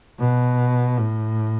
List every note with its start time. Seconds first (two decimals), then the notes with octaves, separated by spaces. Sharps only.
0.19 B2
0.98 A2